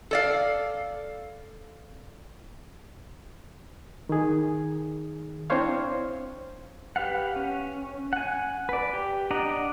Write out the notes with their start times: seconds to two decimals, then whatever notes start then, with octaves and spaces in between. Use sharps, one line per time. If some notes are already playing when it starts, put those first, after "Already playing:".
0.11 A4 D5 F5
4.09 D#3 G#4
5.50 C4 D4 E4 C5 C#5 F5
6.96 G4 B4 F5 F#5
7.36 C#4
8.13 F#5 G#5
8.69 B4 D5
8.93 G4
9.31 D4 D5 D#5 F#5 A#5